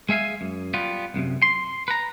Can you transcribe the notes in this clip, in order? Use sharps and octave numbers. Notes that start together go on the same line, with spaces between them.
G#3 G#4 E5 F5 G#5
F#2
G3 B3 F4
B1 F#2 C3
C6
B4 A#5